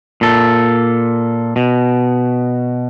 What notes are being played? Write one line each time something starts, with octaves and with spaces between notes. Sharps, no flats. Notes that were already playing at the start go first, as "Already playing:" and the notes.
A#2 A4
B2